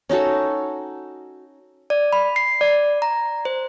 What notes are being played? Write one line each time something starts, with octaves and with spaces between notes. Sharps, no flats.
C#4 D#4 F#4 A4
D5
B5
C7
D5
A#5
C5